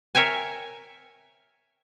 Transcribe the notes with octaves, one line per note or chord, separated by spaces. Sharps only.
A#4 C#5 E5 G5 G#5